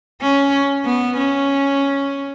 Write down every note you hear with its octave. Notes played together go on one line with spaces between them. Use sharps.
C#4
B3
C#4